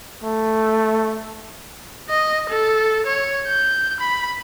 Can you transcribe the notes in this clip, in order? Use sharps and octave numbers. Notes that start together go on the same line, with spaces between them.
A3
D#5
A4
C#5
G6
B5